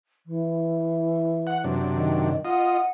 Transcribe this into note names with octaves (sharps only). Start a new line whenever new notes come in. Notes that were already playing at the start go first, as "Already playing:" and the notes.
E3
F#5
F#2 C3 D4
D#3
F4 D#5 F#5